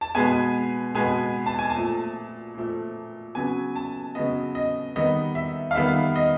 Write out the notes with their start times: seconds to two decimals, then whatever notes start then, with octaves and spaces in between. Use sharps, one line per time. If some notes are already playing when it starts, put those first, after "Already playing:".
0.01 A5
0.15 B2 G#3 B3 G#5
0.95 B2 G#3 B3 G#5
1.46 A5
1.59 G#5
1.70 A5
1.75 A#2 F3 A3
2.55 A#2 F3 A3
3.35 C#3 F#3 B3 G#5
3.76 A5
4.15 C#3 F#3 B3 D#5
4.55 D#5
4.96 D#3 G3 B3 D#5
5.35 E5
5.71 F5
5.75 D#3 G3 B3 E5
6.16 D#5